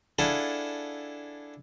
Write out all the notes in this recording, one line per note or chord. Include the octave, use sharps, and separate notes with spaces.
D4 E4 G#4 A4 F5 F#5